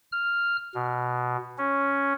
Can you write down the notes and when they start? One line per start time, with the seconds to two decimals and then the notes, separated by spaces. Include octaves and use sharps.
0.12 F6
0.75 B2
1.58 C#4